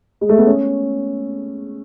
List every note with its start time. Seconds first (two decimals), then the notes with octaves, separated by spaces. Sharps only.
0.21 G#3
0.29 A3
0.38 B3
0.46 C#4